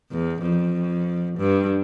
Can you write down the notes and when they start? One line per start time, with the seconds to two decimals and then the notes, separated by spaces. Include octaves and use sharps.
0.11 E2
0.42 F2
1.38 G2